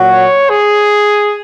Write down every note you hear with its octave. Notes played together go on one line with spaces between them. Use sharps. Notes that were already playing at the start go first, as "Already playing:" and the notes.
Already playing: A#2 F#3 F#4
C#5
G#4